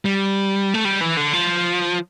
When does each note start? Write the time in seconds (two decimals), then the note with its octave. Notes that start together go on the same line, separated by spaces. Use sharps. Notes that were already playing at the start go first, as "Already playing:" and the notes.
0.05 G3
0.74 A3
0.85 G3
1.01 E3
1.17 D3
1.33 F3